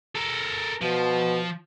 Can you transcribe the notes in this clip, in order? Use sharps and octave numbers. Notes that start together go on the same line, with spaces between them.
A4 A#4
B2 F3